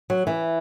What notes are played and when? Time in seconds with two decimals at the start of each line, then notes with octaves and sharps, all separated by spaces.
0.10 F#3
0.27 E3